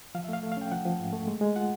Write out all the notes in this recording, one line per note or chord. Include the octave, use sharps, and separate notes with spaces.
F3 F5
E5
A3 F5
A3
F5
C#4 G5
F3 F#5
F3
G#2
A3
G#3
G#3
F4 F#5